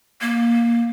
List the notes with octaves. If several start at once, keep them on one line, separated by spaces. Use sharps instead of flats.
A#3